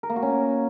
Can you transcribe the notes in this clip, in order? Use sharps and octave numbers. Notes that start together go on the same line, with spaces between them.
A#4
A#3
F#4
C#4